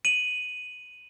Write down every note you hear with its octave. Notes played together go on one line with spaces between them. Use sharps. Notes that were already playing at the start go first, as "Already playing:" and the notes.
D#7 F#7